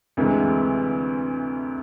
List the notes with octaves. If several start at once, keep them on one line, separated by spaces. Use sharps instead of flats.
D2 C3 E3 G#3